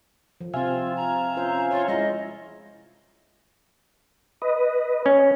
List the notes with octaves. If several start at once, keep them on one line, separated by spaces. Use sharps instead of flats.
F3
C3 C4 F4 E5 F5 G#5
A#5
C#4 F4 C5
F4 C#5
G#3 E4 D#5
B4 D#5
C#4